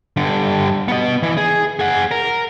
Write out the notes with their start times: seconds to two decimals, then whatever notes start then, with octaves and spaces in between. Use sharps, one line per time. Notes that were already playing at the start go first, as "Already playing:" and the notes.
0.17 G2 D3
0.88 B3 D#5
1.23 E3
1.38 G#4
1.79 G#4 F#5
2.11 A#4